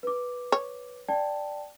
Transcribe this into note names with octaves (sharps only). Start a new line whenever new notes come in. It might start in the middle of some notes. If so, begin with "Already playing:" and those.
B4 D6
C#5
D5 G5 A5